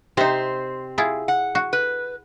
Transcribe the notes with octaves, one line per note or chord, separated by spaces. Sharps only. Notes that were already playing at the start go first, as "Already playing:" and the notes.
C3 C4 D#4 G4 C5
E4 F4 G#4
F#5
F#4
B4